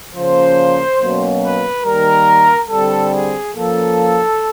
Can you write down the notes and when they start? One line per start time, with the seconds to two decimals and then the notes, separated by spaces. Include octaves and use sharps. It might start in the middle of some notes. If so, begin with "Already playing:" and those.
0.15 C#3 F3 A#3 C#4 C5
1.00 B2 F#3 A#3 C#4
1.42 B4
1.84 D#3 G3 A#3 A#4
2.70 D3 G3 C4 A4
3.13 G#4
3.55 F3 A#3 C#4 A4